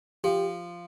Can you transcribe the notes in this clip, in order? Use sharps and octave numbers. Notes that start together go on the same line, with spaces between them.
F3 G4